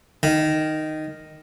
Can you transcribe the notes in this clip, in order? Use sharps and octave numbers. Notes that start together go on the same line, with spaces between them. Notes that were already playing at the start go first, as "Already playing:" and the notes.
D#3